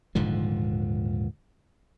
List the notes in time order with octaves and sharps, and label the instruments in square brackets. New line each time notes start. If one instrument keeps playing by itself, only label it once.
[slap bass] D#1 G#2 D3 F3